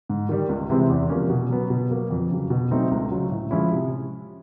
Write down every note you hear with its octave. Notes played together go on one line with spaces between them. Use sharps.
G#2
D#3 G3
C#2
C3 E3 G#3 C4
E2
C3 F3 A#3 C#4
B2
F#3 B3
B2
F#3 A#3
F2
C#3 F#3
B2
F#3 A3 C4 D#4
C#2
C#3 F#3
A2
F3 G#3 C#4 E4
C3